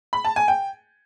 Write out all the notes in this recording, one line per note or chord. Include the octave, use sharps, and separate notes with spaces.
B5
A5
G#5
G5